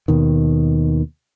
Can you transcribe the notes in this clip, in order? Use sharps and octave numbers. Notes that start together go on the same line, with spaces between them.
D#2 B2 D#3